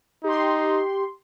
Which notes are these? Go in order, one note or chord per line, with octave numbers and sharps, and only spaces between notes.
D#4 G4 C6